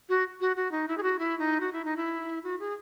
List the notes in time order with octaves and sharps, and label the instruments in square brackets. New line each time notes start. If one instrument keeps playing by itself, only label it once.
[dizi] F#4
F#4
F#4
D#4
E4
G#4
F#4
E4
D#4
F#4
E4
D#4
E4
F#4
G#4